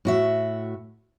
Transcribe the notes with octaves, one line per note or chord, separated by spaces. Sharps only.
A2 F#4 E5